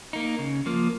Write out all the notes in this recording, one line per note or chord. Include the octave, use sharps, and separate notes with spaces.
A#3 D#4
C#3
F3 A#3